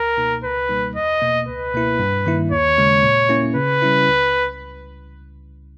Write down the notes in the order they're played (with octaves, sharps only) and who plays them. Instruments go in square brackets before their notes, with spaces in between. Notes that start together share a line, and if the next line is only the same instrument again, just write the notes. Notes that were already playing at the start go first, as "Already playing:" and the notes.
Already playing: [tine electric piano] C#2 [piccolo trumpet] A#4
[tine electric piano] B2 A#3 D#4
[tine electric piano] C#2 [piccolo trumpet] B4
[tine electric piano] B2 G3 A#3 D#4
[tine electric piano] E2 [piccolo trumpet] D#5
[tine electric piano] B2 A#3
[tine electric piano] C#2 [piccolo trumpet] B4
[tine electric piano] B2 A#3 E4
G2
D#3 A#3 E4
[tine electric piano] D#2 [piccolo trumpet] C#5
[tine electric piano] C#3 G#3
A#2
A#3 C#4 E4
[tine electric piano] C#3 [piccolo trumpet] B4
[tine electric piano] G3 C#4 E4
C#2